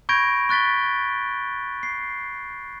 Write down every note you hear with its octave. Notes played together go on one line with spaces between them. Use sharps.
B5 C#6 G6 G#6 A#6 D7
C#6 F#6 A6 B6 G7
C7